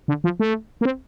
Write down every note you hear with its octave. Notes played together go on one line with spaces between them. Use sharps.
D3
F3
A3
A#3
C4